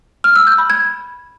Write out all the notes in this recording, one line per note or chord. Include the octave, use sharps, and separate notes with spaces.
F6
E6
G6
B5
G#6